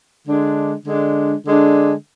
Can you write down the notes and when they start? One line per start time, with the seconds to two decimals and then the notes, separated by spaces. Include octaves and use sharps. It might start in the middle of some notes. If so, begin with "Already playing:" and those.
0.26 D3 G#3 D4
0.85 D3 G#3 D4
1.46 D3 G#3 D4